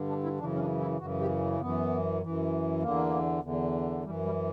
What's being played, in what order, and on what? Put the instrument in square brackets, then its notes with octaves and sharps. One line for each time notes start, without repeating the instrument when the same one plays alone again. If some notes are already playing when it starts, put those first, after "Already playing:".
Already playing: [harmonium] G2 D3
D4
E4
F#2 C#3 E3 D4
C#4
D4
E4
F#2 C#3 E3 F#4
G4
F#2 E3 B3
F#2 E3
E2 D3 A#3
E2 D3
F#2 E3 G3
G3